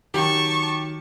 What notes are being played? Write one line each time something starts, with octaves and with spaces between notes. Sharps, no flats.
D#3 F#3 G4 A5 C#6